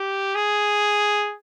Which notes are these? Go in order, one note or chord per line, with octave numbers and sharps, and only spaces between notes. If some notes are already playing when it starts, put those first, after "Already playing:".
Already playing: G4
G#4